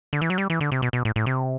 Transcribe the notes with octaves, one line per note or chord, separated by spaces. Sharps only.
D3
E3
F#3
G3
E3
D3
C3
B2
B2
A2
A2
C3